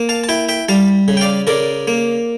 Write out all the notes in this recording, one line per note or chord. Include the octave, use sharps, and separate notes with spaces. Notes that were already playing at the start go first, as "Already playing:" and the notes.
Already playing: A#3
F5 A5
A5
E4 E5 G5
E5 G5
G3 F5 A5
C#3
G5
D5 F5
C#3 A#4 D5
A#3